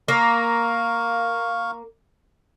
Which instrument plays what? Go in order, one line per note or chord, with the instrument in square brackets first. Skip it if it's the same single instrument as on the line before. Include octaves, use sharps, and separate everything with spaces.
[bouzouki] A#3 [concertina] F5 C#6